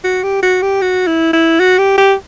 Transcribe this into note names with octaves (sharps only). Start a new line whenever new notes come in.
F#4
G4
F#4
G4
F#4
E4
E4
F#4
G4
G4